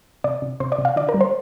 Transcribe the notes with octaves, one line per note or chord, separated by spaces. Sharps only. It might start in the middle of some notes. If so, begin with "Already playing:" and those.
C3 D5
C3
C3 C5
D5
C3
F5
D3 D5
A#4
G3
C5